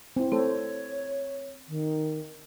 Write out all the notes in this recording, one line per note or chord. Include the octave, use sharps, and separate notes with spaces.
C4 E4
A3 C4 A4 C5 C#5
D#3